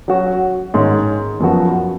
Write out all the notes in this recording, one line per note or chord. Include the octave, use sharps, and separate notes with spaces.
F#3 C#4 F#4
G#2 D#3 G#3 C#4
F#2 F3 B3 F#4